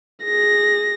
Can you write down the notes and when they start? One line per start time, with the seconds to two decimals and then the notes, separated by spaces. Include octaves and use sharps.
0.24 G#4 A#6